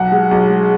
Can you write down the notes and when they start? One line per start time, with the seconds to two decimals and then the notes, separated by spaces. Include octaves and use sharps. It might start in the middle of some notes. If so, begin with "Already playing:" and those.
Already playing: B1 F#5
0.12 G#3
0.31 B1
0.50 G#3